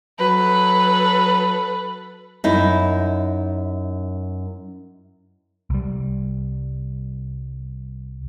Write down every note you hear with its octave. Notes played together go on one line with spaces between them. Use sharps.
F#3 A4 B4
F#2 D#4 E4
C2 G3